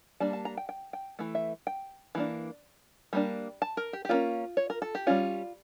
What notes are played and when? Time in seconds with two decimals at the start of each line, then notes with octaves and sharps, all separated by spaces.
0.20 G3 A#3 D4 A5
0.33 A5
0.45 A#5
0.57 G5
0.69 G5
0.93 G5
1.19 E3 A3
1.35 E5
1.67 G5
2.15 E3 A#3 D4
3.13 G3 A#3 D4
3.62 A5
3.77 A#4
3.93 G4
4.05 G4
4.09 G3 A#3 C#4 F4
4.57 C#5
4.70 A#4
4.82 A4
4.95 G4
5.07 G3 C#4 F4